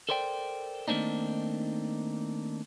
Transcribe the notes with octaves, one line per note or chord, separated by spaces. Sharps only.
A4 A#4 C5 D5 G5
D#3 A3 A#3 C4 D4 D#4